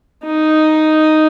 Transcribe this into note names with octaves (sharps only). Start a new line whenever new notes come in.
D#4